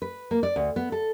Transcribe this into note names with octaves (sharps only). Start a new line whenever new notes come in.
B4
A#3
D5
D2
B3
A4